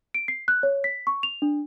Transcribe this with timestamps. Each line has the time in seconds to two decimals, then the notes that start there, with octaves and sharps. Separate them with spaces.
0.14 D7
0.28 C7
0.48 F#6
0.63 C#5
0.84 B6
1.07 C#6
1.23 F7
1.42 D4